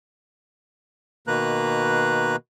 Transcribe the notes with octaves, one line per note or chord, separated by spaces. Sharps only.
B2 D#3 A#3 B4 A#5 F#6